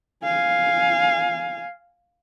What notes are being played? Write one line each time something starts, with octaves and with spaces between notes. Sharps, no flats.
F5 G#5